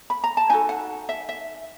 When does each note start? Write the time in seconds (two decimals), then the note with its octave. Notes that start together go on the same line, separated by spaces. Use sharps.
0.10 B5
0.24 A#5
0.37 A5
0.50 D#4 F#4 A4 G#5
0.69 F#5
1.09 E5
1.29 E5